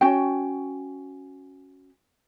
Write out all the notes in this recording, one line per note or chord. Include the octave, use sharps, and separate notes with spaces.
C#4 F#4 G5